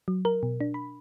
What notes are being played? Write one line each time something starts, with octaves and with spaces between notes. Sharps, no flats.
F#3
A#4
B2
D4
B5